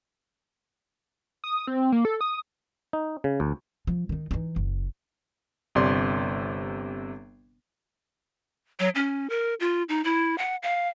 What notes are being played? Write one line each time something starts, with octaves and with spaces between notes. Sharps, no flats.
D#6
C4
A#3
A4
D#6
D#4
C#3
D2
F3
D#3 D#4
E3 D#4
F#1
G1 C3 D5 C6
F#3
C#4
A#4
F4
D#4
E4
F#5
F5